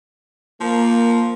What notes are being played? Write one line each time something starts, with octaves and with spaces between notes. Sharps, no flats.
F3 A#3